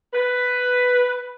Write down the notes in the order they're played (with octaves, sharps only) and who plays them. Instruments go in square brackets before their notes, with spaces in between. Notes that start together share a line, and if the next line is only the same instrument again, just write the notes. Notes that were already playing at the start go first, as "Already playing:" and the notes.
[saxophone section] B4